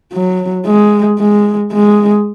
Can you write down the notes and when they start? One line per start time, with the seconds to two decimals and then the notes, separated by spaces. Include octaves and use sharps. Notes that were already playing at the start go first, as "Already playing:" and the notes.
0.13 F#3
0.66 G#3
1.19 G#3
1.73 G#3